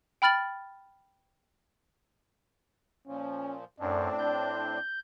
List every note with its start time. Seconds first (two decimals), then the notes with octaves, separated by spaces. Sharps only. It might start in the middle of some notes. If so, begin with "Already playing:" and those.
0.22 G5 B5 F6 A6 F#7
3.07 A#2 F3 C#4
3.80 F#2 A2 C4 D4 D5
4.19 G6